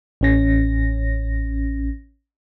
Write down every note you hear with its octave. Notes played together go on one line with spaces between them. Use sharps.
A1 C#4 A#6